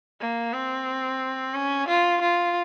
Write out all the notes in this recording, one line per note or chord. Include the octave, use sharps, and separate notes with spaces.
A#3
C4
C#4
F4
F4